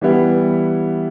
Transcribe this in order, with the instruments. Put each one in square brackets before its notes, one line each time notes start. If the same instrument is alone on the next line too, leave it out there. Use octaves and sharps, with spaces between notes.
[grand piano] E3 G3 B3 E4